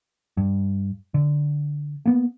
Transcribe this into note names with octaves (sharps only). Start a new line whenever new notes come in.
G2
D3
A#3 B3